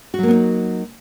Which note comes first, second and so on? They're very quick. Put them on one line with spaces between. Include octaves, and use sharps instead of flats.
F#4 F#3 A#3 B3 D#4